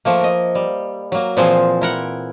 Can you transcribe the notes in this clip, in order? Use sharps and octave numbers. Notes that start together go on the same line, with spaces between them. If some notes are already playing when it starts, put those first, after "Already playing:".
F3 A3 A#3
A#4 D#5
G3
F#3 A#3
A#2 E3 F3 C4 G#4
E4 A#4 F#5